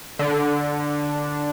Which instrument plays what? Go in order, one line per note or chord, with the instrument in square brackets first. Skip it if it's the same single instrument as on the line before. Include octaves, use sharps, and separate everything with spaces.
[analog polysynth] D3